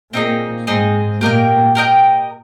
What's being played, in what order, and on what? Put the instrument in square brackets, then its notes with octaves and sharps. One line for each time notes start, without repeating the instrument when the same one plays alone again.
[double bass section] A#2 A#3 [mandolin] C4 D#4 G#4 D#5
[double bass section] G#2 G#3 [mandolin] C4 D#4 G#4 D#5
[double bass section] A#2 A#3 [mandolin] G4 A#4 D#5 G5
[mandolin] G4 A#4 D#5 G5